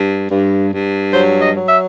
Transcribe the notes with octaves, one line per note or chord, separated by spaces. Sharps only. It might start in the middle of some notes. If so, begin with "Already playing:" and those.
Already playing: G2
G2
G2
F#3 C5
D#5
F#3
E5